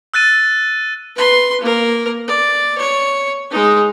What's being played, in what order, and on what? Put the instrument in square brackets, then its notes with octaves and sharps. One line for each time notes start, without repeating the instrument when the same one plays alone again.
[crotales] E6 F#6 A6 D#7
[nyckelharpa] B4 C6
A#3 A#4
D5
C#5
G#3 D#4